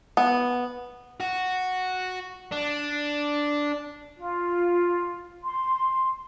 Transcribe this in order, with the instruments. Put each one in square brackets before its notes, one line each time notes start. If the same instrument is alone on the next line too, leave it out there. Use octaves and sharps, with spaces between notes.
[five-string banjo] B3
[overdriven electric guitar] F#4
D4
[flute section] F4
C6